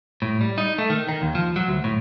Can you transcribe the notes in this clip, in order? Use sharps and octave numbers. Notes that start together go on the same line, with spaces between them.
A2
G3
D#4
A3
D#3
D#3
D#2
F3
F#3
D2
A2